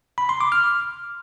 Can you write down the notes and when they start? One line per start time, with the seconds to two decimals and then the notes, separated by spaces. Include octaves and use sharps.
0.18 B5
0.29 C6
0.41 D6
0.52 F6